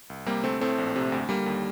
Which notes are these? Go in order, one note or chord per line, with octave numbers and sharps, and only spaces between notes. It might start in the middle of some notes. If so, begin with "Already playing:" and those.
C2
C3 G3 A#3
D2 A3 C4
A2 A3 C4
A#1
C3
D2
D3 G3 A#3
D#2